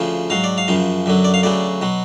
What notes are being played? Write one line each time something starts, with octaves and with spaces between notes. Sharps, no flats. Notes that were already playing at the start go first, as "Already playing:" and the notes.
Already playing: D2 C#3 F3
G#2 F#3 F5
D5
F5
F#2 C#3 F3
F#2 D3 F#3
D5
F5
D2 C#3 F#3 D5
B2 F#3